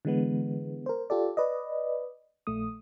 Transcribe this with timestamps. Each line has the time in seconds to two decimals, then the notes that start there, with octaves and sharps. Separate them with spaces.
0.05 D3 E3 G#3 B3
0.86 A#4 C5
1.10 F4 G4 A4 D5
1.37 B4 D5 D#5
2.47 A#1 A3 D#6